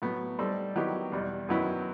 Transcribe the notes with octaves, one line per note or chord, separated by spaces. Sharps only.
A2 F#3 B3
G3 D#4 A4 C5
D#3 F#3 B3 E4 G4
E2 B2 G3
F#2 D#3 F#3 B3 E4